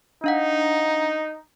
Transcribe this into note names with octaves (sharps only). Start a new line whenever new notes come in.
D4 D#4 F5 F#5